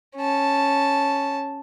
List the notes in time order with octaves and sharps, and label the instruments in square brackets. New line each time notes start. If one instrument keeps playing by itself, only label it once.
[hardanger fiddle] C#4 A5